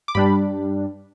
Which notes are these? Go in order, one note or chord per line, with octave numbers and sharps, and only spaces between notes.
D6
G2 G3 D4 B5